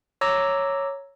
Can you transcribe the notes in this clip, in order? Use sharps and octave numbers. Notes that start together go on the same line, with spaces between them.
C#5 A#5 D6 E6 A#6